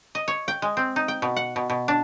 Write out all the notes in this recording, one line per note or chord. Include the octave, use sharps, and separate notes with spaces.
D#5
C#5
G5
G#3
C4
D#4
G5
B2
F#5
B2
B2
D4